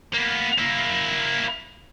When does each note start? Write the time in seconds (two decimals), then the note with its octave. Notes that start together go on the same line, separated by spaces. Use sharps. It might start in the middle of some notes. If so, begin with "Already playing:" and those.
0.14 A#3 B3
0.58 A#3 E4